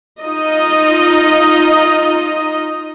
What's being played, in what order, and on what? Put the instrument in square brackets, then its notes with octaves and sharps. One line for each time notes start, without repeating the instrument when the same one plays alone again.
[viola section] D#4 F4 D#5